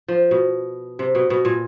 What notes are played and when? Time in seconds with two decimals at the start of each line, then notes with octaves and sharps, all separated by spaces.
0.08 F3
0.31 B2
0.99 C3
1.15 B2
1.30 B2
1.45 A#2